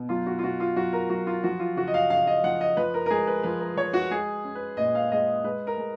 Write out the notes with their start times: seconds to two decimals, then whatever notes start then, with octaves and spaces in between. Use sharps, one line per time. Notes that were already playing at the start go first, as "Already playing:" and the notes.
Already playing: B2
0.09 F#3 F4
0.26 F#4
0.39 F4
0.43 B2 F#4
0.60 F4
0.76 F#3 F#4
0.93 A#4
1.09 F#3 F#4
1.27 F4
1.43 F3 F#4
1.59 F4
1.76 C#3 F#4
1.88 D#5
1.94 F5
2.10 C#3 F5
2.27 D#5
2.44 F3 F#5
2.61 D#5
2.77 F3 B4
2.94 A#4
3.06 A#4
3.10 G#3 G#4
3.27 B4
3.43 F3 B4
3.61 A#4
3.77 F3 C#5
3.93 F#4
4.10 G#3 G#4
4.44 C#4
4.55 B4
4.77 A#2 D#5
4.95 F5
5.11 G#3 D#5
5.44 G#3 B4
5.67 A#4
5.78 G#3